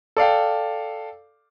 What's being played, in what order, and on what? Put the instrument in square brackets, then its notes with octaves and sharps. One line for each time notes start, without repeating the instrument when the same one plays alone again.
[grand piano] A4 D5 F5 G5